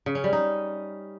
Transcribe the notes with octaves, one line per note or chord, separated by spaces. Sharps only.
C#3
C#4
G3
D#4